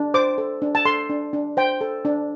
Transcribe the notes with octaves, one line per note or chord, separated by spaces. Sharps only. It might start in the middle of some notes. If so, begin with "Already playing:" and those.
Already playing: D4
C5 D6
A4
D4
A5
A4 C6
D4
D4
C5 G5
A4
D4